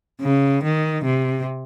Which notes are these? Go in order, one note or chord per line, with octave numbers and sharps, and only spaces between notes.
C#3
D#3
C3